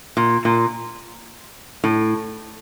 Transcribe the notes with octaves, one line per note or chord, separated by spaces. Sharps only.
A#2
A#2
A2